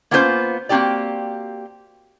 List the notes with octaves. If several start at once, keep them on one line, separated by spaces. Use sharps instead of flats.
A#3 B3 C#4 F4 G#4 C5
A#3 C4 E4 F#4 G4 D5